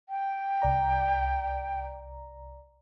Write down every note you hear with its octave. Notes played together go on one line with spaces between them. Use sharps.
G5
C2 D5 A#5